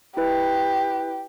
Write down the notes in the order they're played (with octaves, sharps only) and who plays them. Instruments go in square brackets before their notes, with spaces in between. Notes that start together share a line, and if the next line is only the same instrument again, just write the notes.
[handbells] E4 B4 [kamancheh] G4